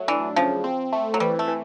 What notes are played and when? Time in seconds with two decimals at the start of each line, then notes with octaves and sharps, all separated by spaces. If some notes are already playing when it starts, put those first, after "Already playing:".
Already playing: F#3 A3
0.08 E3 D4
0.36 C#3 F3
0.64 C4
0.93 A3
1.14 F#3
1.20 E3 G3
1.39 A3
1.48 E3